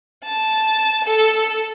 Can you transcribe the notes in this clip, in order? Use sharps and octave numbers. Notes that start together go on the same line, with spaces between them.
A5
A4